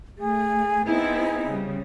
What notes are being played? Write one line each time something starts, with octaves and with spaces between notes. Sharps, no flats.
A3 G#4
B3 C4 D#4 E4 G#4
C#3 G3